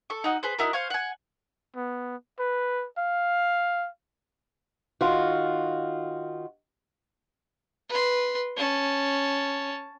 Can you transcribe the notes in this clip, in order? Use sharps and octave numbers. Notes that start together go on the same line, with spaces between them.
A4 C#6
D#4 F#4 D#5
G#4 B4 C5
D#4 E4 F#4 A#4
C5 F5 G#5 C#6
F#5 G#5
B3
B4
F5
D#3 F4 F#4
B4 C6
C#4 A5